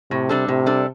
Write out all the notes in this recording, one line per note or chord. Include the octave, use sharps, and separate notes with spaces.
A2 C3
G3 D4 A4
A2 C3
G3 D4 A4